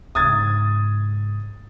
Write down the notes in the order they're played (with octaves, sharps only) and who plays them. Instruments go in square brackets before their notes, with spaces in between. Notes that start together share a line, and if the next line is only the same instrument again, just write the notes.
[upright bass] G#2 C#3 [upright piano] D#6 G#6 A6